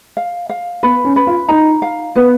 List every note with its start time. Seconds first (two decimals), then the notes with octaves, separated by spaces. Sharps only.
0.17 F5
0.49 F5
0.83 B3 B4
1.04 C#4
1.16 B4
1.27 F4
1.49 D#4 A#5
1.82 F5
2.15 B3 B4